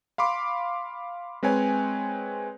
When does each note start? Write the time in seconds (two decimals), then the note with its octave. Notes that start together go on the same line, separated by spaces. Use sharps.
0.18 F5 B5 C6 D6
1.43 G#3 C4 B4 C#5 G#5